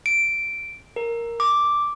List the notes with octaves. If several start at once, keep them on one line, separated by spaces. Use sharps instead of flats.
D7
A#4
D6